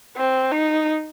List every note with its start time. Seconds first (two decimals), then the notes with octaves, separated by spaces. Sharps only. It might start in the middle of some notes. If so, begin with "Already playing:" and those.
0.17 C4
0.52 D#4